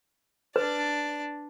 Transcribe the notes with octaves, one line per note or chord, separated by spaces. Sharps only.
D4 B4 D5